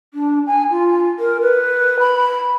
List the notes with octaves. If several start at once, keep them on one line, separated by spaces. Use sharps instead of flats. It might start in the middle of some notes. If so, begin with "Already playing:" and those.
D4
G#5
F4
A#4
B4
B5